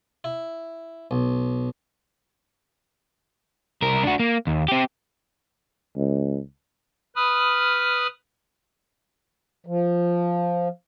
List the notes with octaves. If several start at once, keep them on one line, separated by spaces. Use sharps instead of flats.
E4
B1
C2 A#4
D4 F#4
A#3
D#2
C4 G4
C#2
B4 B5 D#6 F6
F3